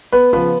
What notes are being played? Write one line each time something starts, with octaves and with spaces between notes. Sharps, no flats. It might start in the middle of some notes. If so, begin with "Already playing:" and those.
B3 B4
C#3 F3 B3 B4